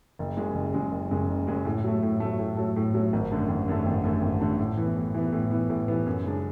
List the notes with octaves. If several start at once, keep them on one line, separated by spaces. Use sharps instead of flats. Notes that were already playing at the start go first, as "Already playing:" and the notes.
F#1
F#2 C#3 G#3
F#1
F#2 C#3 G#3
F#1
F#2 C#3 G#3
F#1
F#2 C#3 G#3
A2
F#3 A3
A2
F#3 A3
A2
F#3 A3
A2
F#3 A3
G#1
F#2 D3 A3
G#1
F#2 D3 A3
G#1
F#2 D3 A3
G#1
F#2 D3 A3
A2
E3 B3
A2
E3 B3
A2
E3 B3
A2
E3 B3
F#2
C#3 G#3 D4